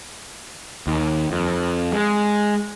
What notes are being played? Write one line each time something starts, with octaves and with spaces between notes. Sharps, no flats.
D#2
F2
G#3